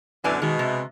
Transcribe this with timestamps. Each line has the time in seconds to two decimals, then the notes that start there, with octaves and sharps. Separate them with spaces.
0.24 F#2 B2 D3 E3 D5 G#5
0.42 B2 D#3 G#3
0.59 C3